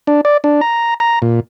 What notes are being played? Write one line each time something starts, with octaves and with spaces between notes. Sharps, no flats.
D4
D5
D4
A#5
A#5
A#2